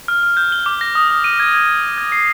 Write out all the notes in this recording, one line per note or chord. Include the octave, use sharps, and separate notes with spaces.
F6
F6
G6
G7
D6
A#6
D#6
D#6
D#7
G#6
G#6
D#7
G#6
G#6
C7